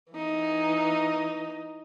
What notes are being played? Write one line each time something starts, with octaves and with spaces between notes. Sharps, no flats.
E3 D#4